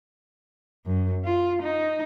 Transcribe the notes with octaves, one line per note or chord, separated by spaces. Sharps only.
F#2
F4
D#4